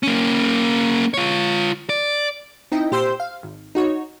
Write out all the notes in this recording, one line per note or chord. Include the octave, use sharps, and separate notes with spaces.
A#3 C#4
F4 C#5
D5
C4 D#4 E4 D#5 G5
A#2 G4 C5 C6 E6 G6
F5
G#1
D#4 F#4 C#5